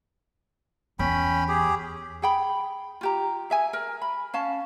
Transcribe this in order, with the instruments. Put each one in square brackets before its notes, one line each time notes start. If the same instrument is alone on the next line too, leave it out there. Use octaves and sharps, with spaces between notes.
[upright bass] E2 [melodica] C#4 G5 B5
[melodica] G4 G#4
[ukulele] G#4 G5 B5
F4 G4 A#5
G#4 E5 G#5
A#4
B5
C#4 F5 A5